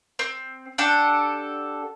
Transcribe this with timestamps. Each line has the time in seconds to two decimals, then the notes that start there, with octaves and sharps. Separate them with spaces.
0.19 C4
0.78 D4 G4 A4 F#5